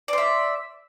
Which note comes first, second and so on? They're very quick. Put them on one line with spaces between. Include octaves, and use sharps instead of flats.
D5 C5 E5